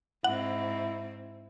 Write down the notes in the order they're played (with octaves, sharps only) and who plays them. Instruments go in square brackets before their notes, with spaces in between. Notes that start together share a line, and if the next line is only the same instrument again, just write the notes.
[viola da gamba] G#2 C4 [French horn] E4 [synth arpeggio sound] F#5